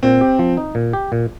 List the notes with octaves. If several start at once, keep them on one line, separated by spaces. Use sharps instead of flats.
A#2 C4
G4
F3
D#4
A#2
G4
A#2